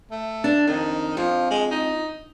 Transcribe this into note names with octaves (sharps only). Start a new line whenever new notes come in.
A3
D4
F2 D#3
F2 F3
G#3
D#4